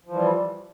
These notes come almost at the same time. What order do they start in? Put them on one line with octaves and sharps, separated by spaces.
F3 E3 G3